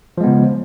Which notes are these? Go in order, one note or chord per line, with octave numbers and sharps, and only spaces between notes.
C#3 F3 G#3 B3